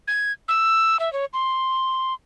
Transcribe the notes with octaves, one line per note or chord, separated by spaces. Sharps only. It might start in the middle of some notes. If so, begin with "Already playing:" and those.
G#6
E6
E5
C#5
C6